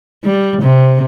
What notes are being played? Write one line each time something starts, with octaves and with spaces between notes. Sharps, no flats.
G3
C3